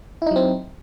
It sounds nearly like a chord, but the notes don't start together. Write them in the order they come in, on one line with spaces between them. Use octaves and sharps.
E4 D#4 F#3 C4